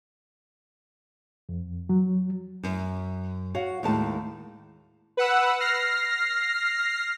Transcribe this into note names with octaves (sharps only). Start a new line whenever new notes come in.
F2
F#3
F#2
F#4 C#5 F5 F#5
D#2 A2 D#3 G#3 A5
B4 F#5 E6
F6 A#6 C7